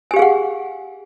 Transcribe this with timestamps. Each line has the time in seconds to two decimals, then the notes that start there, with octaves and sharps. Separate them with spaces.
0.11 G#5
0.14 G4
0.16 F5
0.19 G#4
0.22 F#5